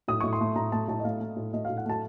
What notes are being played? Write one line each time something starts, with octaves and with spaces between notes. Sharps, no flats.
A2 D#6
A2 C#6
C6
A3
A2 A#5
A3 A5
A2 A5
D#5
A3 F5
A3
A2
A3 D#5
A2 F5
F#5
A3 A5